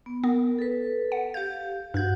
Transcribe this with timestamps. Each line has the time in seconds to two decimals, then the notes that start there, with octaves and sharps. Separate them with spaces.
0.06 B3
0.24 B3 A#4
0.59 A4 B4
1.12 F#5
1.34 G4 F5 G6
1.94 G2 F#4 F#5 G6